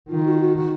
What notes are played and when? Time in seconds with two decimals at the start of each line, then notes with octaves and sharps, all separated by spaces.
0.10 D#3 F4
0.26 F#4
0.36 F4
0.41 F#4
0.57 F#4